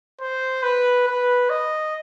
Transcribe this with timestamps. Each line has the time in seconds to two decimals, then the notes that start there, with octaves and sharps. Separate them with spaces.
0.20 C5
0.63 B4
1.07 B4
1.50 D#5